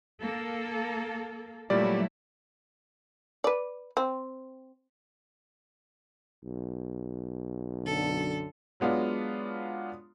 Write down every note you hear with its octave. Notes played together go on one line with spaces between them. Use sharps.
A#3 A4
A#2 F#3 G3 A3 E4 D5
B4 D5
C4
B1
F#2 D3 A4
F#3 G#3 B3 D4 F4